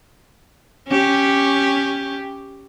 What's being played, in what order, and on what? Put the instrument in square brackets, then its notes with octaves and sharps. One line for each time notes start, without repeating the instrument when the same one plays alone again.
[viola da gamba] C#4 G4